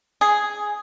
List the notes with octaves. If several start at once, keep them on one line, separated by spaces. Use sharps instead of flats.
G#4